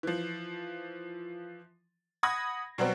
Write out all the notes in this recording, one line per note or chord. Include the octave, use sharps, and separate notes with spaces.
E3 F3
F#5 B5 D#6 G#6 A#6
B2 F#3 G3 B3 C4